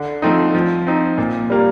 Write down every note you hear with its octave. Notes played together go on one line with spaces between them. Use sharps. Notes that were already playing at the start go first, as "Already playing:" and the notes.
Already playing: D3
F3 A3 C4 D#4
F3
C4 D#4
A#2
G3 A#3